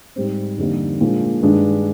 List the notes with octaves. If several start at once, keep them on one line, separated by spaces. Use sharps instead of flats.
G#2 G3 C4
F2 D3 G3 A#3 D#4
A#2 F3 G#3 D4
G2 D#3 G#3 D4